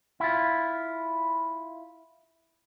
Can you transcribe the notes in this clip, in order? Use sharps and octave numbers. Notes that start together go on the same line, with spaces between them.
E4 F4